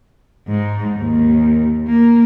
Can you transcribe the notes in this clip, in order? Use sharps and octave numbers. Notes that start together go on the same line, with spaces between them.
G#2
D#2
A#3